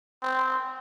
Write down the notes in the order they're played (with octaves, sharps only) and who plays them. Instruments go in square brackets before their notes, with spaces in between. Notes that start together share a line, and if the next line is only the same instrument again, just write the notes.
[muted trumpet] C4